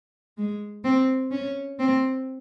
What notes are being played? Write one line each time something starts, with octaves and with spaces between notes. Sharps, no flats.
G#3
C4
C#4
C4